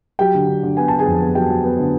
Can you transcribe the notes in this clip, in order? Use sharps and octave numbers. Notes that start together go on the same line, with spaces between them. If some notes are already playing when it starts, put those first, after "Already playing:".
F#3 G4 G5
D3
D3
D3
B3 G#5
D3 A5
G#4 G#5
F2
B3
F#3 G4 G5
F#3
B3
D3